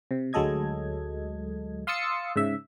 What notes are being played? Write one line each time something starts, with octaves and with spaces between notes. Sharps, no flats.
C3
D2 F#3 G#3 A4 D#5 G#6
F5 C6 D#6 E6 A6 C#7
G#2 C#3 E5